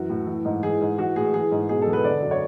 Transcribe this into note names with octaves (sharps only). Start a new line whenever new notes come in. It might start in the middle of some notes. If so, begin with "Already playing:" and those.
Already playing: F#2 E3 F#4
A2
E3
G#2
E3 G#4
G#2
E3 F#4
A2 G#4
E3 G#4
G#2
B2 G#4
A4
E2
B4
D3 D5
F#2
C#5